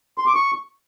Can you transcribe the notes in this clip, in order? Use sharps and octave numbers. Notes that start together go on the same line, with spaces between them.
C6
D6
C#6